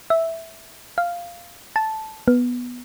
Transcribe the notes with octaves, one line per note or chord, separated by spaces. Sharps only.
E5
F5
A5
B3